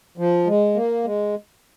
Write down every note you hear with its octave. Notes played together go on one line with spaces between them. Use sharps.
F3
G#3
A#3
G#3